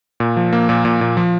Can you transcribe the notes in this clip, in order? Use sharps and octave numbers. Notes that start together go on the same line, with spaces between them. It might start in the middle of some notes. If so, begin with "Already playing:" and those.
A#2
F3
A#3
A#2
A#2
A#2
F3